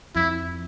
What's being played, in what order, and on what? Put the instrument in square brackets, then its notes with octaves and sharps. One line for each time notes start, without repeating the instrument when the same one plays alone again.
[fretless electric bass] F2 [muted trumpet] E4